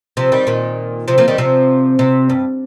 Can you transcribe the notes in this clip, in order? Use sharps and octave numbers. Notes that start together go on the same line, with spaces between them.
C3 F3
D#3 G3
A#2 D#3
C3 F3
F3 A#3
D#3 G3
C3 F3
C3
G2